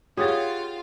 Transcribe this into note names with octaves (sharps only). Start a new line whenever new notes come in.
F4 G4 G#4 C#5 F5 F#5 A6